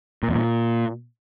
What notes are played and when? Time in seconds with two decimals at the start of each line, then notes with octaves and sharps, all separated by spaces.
0.23 A#2
0.29 E2
0.34 A#2